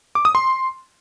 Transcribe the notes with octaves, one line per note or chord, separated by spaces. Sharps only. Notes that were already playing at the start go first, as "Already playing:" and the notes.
D6
D#6
C6